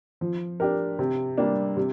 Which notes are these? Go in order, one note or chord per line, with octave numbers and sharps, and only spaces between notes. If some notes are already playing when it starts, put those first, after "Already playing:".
F3
D4 G4 A#4
C3
G3 A#3 D4
C3